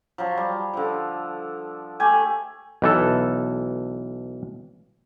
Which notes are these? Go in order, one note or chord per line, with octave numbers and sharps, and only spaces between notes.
F3 F#3
G3
D3 F3
A3 G4 G#5
B1 E3 A4